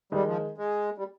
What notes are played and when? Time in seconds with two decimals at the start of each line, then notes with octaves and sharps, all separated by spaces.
0.12 D#3 G3 G#3 D#4
0.27 F3
0.58 G#3
0.98 G3